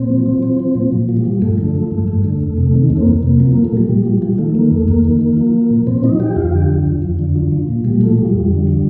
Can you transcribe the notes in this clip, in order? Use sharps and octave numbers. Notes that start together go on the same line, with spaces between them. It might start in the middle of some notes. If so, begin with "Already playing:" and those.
Already playing: A#2 C4
F3
F3
F3
F3
A#2
A#2
F3
G3
F3
G2 A3
D3
F3
G2
G2
D3
F2
C3
D#3
F2 A3
C4
F2 A#3
C3 A#3
F3
F3 A#3
A3
A#2 G3
A#2
F3
F3
D#3 A3
D#3 A#3
F2 A3
F2 A#3
D#3
D#3
F3
F3
A#2
A#2 C4
F3 D#4
F3 G4
F2 F4
D3 G4
F3
F2
F2
D3
F3
F3
A#2
A#2 G3
F3 A3
F3 G3
F2
D3
F3